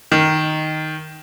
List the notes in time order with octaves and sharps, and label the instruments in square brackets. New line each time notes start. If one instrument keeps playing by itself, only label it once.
[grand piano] D#3